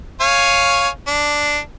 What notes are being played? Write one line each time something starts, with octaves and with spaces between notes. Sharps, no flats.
C#5 F5 G#5
D4